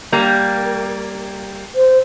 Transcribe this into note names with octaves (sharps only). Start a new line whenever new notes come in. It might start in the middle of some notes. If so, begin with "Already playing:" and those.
G3 A#3
C5